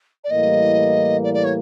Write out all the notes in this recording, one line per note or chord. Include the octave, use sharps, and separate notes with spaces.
D5
A2 E3 G3 A#3 D#5
D5
D5
C#5